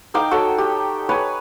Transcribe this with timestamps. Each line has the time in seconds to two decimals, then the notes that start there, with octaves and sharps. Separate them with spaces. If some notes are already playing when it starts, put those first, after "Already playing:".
0.14 D#4 F5 G5 D6
0.31 F#4 A4 C#5 G5
0.58 G4
1.09 B4 C#5 G#5